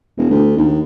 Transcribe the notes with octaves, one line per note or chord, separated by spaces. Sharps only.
E1
D2
D#2